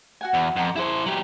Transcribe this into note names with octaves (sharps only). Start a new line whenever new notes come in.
F#4 F#5 G#5
E2
F2 F#5 A#5 D6
E4 G#4 C5 C#5 D6
F#3 G4